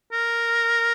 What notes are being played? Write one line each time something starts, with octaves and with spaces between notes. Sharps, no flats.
A#4